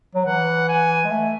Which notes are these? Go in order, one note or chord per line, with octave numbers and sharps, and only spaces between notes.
F#3
E3 F#5
G#5
G#3
A3